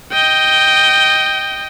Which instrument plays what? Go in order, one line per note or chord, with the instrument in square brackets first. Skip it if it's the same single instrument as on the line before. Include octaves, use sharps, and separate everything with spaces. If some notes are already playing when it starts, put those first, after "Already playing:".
[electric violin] D#5 G5